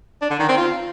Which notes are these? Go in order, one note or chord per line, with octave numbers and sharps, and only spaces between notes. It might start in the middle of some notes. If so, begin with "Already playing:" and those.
D4
D3
D#3
C4
F4